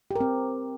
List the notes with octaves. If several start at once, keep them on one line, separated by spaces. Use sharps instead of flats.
C4 G4 A#4